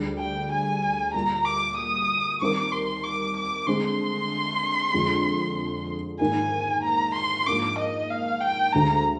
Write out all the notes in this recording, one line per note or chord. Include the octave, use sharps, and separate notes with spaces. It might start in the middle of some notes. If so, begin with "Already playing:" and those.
Already playing: D2 D3 G3 D4 G#4
G5
G#5
A#2 G3 A#3 A#5
D6
D#6
D#3 G3 C4 D#4 A#4 D6
C6
D6
D6
D3 G#3 C4 C6
F2 D3 G#3 D4
G#2 D#3 A#3 D#4 A#4 G#5
A#5
C6
G#2 F3 A#3 D4 D6
D#5
F5
G5
D2 D3 G#3 D4 A#5